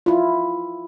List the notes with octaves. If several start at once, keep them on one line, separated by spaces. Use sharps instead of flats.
E4 F4